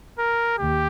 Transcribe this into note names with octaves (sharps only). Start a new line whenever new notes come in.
A#4
D#2 G4